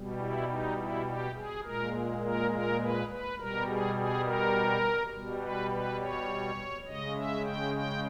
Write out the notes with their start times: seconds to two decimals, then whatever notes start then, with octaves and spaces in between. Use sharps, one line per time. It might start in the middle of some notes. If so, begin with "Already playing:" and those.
Already playing: B2 G3
0.19 E4
0.48 D#4
0.76 E4
1.05 G4
1.34 G#4
1.63 A#2 G#3 A#4
2.22 A#4
2.51 A#4
2.80 B4
3.09 B4
3.37 B2 G3 A#4
3.67 G#4
3.95 G#4
4.24 A#4
5.12 B2 G3
5.41 B4
5.70 B4
6.00 C#5
6.86 C#3 G#3 D#5
7.16 E5
7.44 G5
7.74 G5